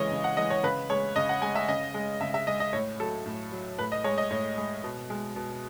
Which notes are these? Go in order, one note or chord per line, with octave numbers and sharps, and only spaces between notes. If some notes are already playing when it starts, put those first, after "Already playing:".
Already playing: C#3 E3 G#3 C#5 D#5
C#3
F#5
E3 G#3 D#5
C#5
C#3 B4
G#3 C#5
C#3 D#5
F#5
G#3 G#5
E5
C#3 D#5
G#3
C#3 E5
E5
G#3 D#5
D#5
A2 C#5
F#3 A4
A2
F#3
A2 B4
D#5
G#3 C#5
D#5
A2 C#5
G#3
B2
G#3
B2